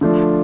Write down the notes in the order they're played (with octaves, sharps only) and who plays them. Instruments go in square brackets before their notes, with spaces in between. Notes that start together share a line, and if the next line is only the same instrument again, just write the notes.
[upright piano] D3 F3 A3 D4 F4